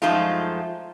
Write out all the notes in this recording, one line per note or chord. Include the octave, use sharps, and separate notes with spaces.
F#2 F3 G#3 A3 D#4 F4